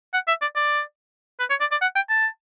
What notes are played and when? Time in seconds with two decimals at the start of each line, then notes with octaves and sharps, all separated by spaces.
0.14 F#5
0.28 E5
0.41 D5
0.56 D5
1.40 B4
1.50 C#5
1.60 D5
1.71 D5
1.82 F#5
1.95 G5
2.10 A5